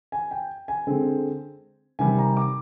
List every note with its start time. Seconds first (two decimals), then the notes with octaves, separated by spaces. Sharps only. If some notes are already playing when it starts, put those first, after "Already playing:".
0.12 G#5
0.31 G5
0.68 G#5
0.87 D3 G#3 C4
1.99 C3 D#3 G3 C4 G#5
2.18 A#5
2.37 D6